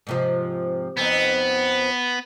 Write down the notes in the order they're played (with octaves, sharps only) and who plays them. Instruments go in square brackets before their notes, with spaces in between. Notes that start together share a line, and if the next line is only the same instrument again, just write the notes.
[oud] G#2 C3 F3
[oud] F2 C4 D#4 [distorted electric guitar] B3